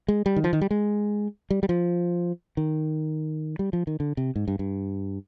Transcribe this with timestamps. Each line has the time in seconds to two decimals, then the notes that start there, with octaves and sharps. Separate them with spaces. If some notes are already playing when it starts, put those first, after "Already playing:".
0.08 G#3
0.26 G3
0.36 D#3
0.44 F3
0.53 D#3
0.61 G3
0.71 G#3
1.50 G3
1.63 G3
1.69 F3
2.57 D#3
3.59 G3
3.73 F3
3.87 D#3
4.00 D3
4.17 C3
4.36 G#2
4.48 G2
4.59 G2